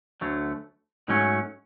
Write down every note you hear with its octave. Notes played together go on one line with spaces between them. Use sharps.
D2 D3 F#3 A3
G#2 F#3 A3 C#4